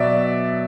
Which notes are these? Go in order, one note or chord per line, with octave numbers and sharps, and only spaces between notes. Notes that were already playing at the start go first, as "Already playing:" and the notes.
Already playing: B2 F#3 D5 E5